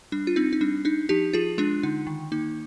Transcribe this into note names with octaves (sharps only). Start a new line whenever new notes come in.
G3 D4
F4
C4 D#4
D#4
G3 D4
D4 D#4
F3 D#4 G4
F3 F4 G#4
G#3 D4 F4
D3 D#4
D#3
A#3 D#4